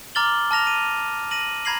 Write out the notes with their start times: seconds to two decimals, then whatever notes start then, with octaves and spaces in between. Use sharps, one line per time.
0.15 A#5 D6 F6 A6 F#7 G7
0.51 A5 F6 A#6 F7
0.67 D#7
1.31 A#6 D#7 F#7
1.65 A#5 B5 G#6 A#6 C7 F#7